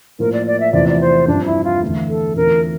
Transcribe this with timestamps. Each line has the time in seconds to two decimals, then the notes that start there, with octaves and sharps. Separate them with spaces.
0.19 A2 F3 A#3 A#4
0.33 D5
0.47 D5
0.60 E5
0.73 E2 C3 F3 A3 E4 D5
0.89 D5
1.01 C5
1.28 G2 F3 C4 D4
1.46 E4
1.64 F4
1.82 E2 D3 A3
2.09 A4
2.36 E2 D3 A3 C4 F4 A#4